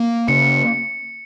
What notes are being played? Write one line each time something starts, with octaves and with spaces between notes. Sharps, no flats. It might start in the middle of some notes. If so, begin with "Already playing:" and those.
Already playing: A#3
C#3 C#7